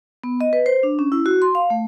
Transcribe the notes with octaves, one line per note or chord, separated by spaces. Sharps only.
B3
D#5
B4
C5
D4
C#4
E4
F#4
C6
F5
A3